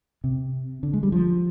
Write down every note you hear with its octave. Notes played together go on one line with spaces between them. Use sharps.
C3
D3
G#3
G3
F3